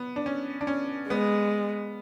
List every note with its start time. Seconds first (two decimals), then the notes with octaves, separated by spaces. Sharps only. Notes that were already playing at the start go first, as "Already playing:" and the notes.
Already playing: B3
0.16 D4
0.26 C#4
0.61 D4
0.67 C#4
1.09 G#3 B3